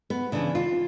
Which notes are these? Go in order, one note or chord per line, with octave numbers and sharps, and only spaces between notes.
B3
C#3 E3 D4
F4